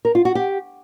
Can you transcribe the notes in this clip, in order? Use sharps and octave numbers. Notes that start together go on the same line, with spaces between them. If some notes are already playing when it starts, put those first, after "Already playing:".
A#4
F4
F#4
G4